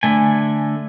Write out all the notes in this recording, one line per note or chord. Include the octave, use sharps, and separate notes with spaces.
D3 A3 G#5